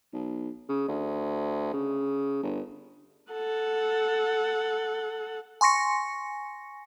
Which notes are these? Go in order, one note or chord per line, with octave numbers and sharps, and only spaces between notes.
B1
C#3
D2
C#3
G1
A4 F#5
G#5 C6 C#6 A#6 C#7